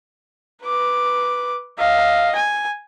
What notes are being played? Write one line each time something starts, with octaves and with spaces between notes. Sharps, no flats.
B4 D6
D#5 F5
G#5